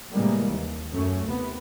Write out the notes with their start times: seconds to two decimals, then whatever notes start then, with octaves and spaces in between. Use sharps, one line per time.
0.13 A2 C3 E3 G3 G#3 A#3
0.47 D#2
0.92 F#2 A3 C#4
1.26 D#2 C3 B3